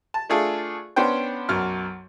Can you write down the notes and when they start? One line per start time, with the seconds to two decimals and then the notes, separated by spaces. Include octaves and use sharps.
0.14 A5
0.29 A3 D4 F4 G#4 A4
0.96 B3 C#4 D4 C5 G5
1.49 B1 F#2 F6